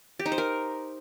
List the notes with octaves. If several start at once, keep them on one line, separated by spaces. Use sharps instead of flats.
G4
D#4
C5
A#4